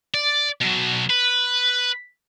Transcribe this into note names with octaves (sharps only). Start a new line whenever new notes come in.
D5
B2 F#3
B4